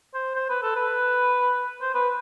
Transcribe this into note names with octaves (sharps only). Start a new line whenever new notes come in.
C5
C5
B4
A4
B4
C5
B4